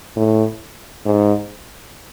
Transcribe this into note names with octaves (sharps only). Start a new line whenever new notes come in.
A2
G#2